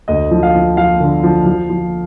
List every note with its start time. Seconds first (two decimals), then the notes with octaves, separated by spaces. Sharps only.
0.08 D2 D#5
0.31 F3
0.43 F5
0.55 F3
0.77 F3 F5
1.00 D3
1.23 F3
1.46 F3
1.70 F3